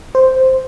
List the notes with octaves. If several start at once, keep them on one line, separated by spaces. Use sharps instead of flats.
C5